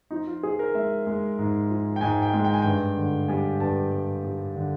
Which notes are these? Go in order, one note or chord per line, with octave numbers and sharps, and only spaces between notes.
F3 D#4
F4
F3 G#4
A#4
G#3 E5
G#3
G#2
F3
G5
G#2 G#5
G5
G#3
G5
G#5
G2 G5
D3
G3 G#5
G2 A5
G3
G3
D3